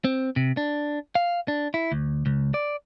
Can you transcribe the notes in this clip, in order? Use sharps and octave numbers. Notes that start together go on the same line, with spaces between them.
C4
C3
D4
F5
D4
E4
D2
C#2
D5